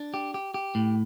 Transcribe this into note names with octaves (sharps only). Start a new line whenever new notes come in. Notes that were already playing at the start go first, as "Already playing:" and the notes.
Already playing: D4
G4
G4
G4
A2